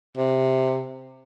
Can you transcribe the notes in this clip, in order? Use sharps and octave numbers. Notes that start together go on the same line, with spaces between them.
C3